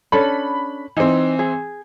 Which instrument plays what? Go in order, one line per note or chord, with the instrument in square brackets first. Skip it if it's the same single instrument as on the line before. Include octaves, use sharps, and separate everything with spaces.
[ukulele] C#4 D4 A4 [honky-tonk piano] B5
[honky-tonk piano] E3 C4 [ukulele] D#4
[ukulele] G#4